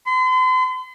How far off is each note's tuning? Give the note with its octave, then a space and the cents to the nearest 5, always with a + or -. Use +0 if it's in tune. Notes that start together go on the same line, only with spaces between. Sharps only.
C6 -40